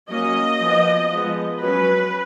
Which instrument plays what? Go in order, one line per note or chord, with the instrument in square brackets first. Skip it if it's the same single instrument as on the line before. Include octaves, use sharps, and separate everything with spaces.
[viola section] F#3 A#3 C#4 D#5
F3 B3
F3 G#3 B3
F#3 C#4 B4